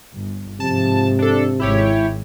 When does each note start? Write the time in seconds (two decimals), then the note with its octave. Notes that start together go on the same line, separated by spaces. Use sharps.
0.14 G1
0.60 G#2 C3 F3 A5
1.19 D4 A4
1.60 G#1 G#3 E4 G4 C#5